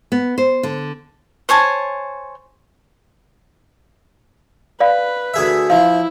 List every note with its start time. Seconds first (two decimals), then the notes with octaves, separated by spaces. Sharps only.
0.12 B3
0.38 C5
0.63 D3
1.49 C5 C#5 G#5 A5
4.80 B4 D5 F5 B5
5.34 D2 G#4 E5
5.70 F3 E4 F5